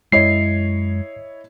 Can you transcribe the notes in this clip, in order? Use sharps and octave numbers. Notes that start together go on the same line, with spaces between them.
F#2 G#3 E4 C#5 D#5 C7